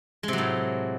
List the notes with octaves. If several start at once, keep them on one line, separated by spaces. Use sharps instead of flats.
A2 C3 F#3 G#3